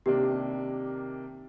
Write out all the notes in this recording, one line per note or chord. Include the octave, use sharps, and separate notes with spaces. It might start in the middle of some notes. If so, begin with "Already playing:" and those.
C3 D#3 A#3 D4 G4